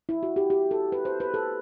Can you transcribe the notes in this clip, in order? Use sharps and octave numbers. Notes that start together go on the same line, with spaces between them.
E4
F#4
G4
G4
A4
B4
C5
B4
A4